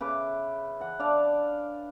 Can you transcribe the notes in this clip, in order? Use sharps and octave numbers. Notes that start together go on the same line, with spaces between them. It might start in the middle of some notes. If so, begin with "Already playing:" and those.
C#3 B4 E5 D6
E3 F#5
D4 D5 F5 A5